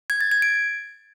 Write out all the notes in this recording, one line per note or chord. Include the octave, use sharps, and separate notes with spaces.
G#6
A6
G#6
D7